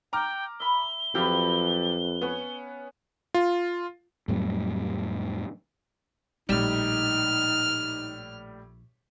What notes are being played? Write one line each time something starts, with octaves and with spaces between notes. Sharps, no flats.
G5 A#5 D6 F6
E5 B5 G7
F2 F3 F#3 G4 B4 F5
B3 C#4 C#5 F#5
F4
F2 A2 F#3 G3
A#1 A2 G3 D#4 F6